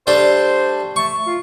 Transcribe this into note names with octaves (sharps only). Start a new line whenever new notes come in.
G3 A3 D4 C5
A3 C#6
F4